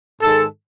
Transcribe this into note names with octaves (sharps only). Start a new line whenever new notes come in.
G#2 D#3 G#3 A4